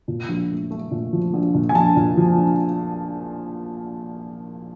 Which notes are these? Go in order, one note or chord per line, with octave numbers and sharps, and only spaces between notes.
A#2
A#1
A3
A3
A#2
F3
A#1
A#2
G#5
A#1 A5
A#2
F3
A#1